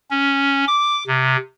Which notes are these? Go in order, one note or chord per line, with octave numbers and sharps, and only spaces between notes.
C#4
D6
C3